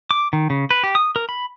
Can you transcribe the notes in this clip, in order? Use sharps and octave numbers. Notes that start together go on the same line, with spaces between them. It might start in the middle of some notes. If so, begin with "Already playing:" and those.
D6
D#3
C#3
B4
G4
D#6
A#4
B5